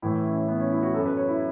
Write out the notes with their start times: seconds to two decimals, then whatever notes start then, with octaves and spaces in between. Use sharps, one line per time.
0.02 A2 E3 E4
0.25 C#4
0.48 B3
0.59 C#4
0.71 E4
0.83 F#4
0.94 F#3 A4
0.98 F#2
1.06 B4
1.17 C#5
1.28 E4